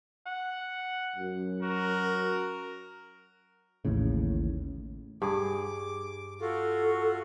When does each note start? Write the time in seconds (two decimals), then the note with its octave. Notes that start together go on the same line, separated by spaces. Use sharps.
0.27 F#5
1.16 F#2
1.63 F#4 A#4
3.85 A1 D#2 A2 C#3
5.22 G2 G#4 D6
6.41 F4 F#4 A4